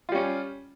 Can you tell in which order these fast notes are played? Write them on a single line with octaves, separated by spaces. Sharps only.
F4 G3 C#4